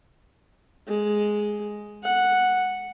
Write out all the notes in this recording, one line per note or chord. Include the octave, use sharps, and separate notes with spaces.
G#3
F#5